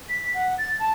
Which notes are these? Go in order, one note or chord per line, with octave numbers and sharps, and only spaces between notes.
B6
F#5
A6
A5